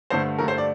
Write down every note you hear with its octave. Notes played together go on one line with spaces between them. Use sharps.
G2 D3 A3 C5
G2 D3 A3 A#4
C5
D5